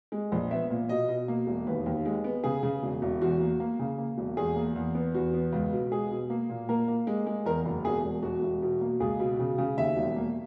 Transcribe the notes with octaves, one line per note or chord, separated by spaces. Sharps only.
G#3
A#1
B3 E5
A#2
B2 D#5
B2
A#3
E1
D#2 B4
D#2
G#3
B3
C#3 G#4
C#3
E1
E1
E2 F#4
A#3
A#3
C#3
A#3
E1
E2 G#4
A#3
E2
B3
E2 F#4
B3
C#2
B2
G#3 G#4
B2
A#3
A#2
A#3 A#4
A#3
G#3
G#3
E2 A#4
F#1
E1 G#4
E1
E1 F#4
E1
B2
A#3
C#2 G#4
B2
C#3
C#3
D#2 E5
E1
A#3